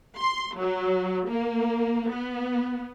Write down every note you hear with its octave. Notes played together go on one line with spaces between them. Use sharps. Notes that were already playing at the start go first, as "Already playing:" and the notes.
C6
F#3
A#3
B3